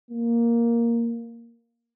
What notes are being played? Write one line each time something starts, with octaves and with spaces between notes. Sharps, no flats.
A#3